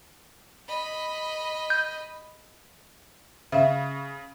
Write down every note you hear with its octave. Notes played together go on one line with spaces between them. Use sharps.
D#5 B5
G6
C#3 E5 F5